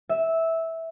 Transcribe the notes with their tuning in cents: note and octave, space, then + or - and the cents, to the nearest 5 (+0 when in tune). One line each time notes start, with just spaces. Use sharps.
E5 -10